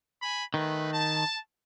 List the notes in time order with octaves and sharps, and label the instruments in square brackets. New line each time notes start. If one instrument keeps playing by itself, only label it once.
[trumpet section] G#5 B5
[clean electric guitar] D#3 [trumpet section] A3 B4
[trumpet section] A5